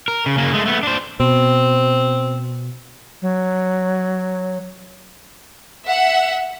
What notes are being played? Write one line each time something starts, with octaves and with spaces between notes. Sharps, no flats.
A#4
C#3
C#3 A#3
G#3 A3
A3 B3
D4 C5
B2 C4
F#3
E5 F#5